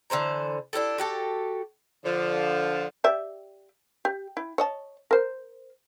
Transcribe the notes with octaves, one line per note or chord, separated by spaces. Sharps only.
D3 E3 C5 A#5
D4 E4 G4 A4
F#4 G4 A4
D3 F3
G4 D5 E5
G4
E4
C#5 D#5 A5
A#4 C5